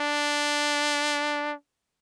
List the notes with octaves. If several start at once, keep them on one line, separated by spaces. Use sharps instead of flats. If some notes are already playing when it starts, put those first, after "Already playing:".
Already playing: D4